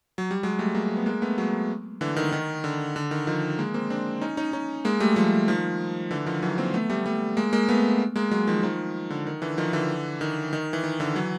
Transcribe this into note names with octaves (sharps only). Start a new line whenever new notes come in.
F#3
G3
F#3 G#3
G3 A3
G#3 A#3
B3
G#3 A#3
A3 B3
F#3 G#3
D3 E3
D#3
D#3
D3
D3
D#3
D#3 F3
G#3 A#3
A#3 C4
C4 D4
C#4 D#4
C#4 D#4
C#4 D#4
G#3 A#3
G3 A3
F3 G3
D#3 F3
D3 E3
D#3 F3
E3 F#3
A#3 C4
A3 B3
G3 A3
G3 A3
G#3 A#3
G#3 A#3
A3 B3
G#3 A#3
F#3 G#3
D#3 F3
D#3 F3
D3
D#3
D3 E3
D#3 F3
D3 E3
D#3
D#3
E3
D#3
D3 E3
E3 F#3